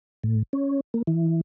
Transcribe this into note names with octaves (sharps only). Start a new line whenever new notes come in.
A2
C#4
A#3
E3